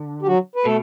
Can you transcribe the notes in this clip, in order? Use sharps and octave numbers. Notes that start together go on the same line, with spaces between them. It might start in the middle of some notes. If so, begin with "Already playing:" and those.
Already playing: D3
G4
F#3 F#4
B4
B2 A3 A4